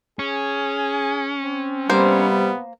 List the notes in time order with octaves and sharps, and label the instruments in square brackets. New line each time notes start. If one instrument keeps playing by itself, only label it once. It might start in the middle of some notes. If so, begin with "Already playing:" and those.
[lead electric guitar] C#4 [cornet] G#4
[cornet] C4
[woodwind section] C3 G3 [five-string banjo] A#3 C5 [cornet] B3